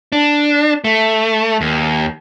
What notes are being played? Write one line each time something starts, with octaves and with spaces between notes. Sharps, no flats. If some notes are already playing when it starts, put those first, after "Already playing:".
D4
A3
D#2